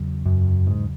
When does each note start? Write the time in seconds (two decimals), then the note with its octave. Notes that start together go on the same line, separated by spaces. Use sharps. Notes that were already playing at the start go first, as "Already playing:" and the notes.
Already playing: E2 C#3 F#3
0.26 F#2
0.67 G#2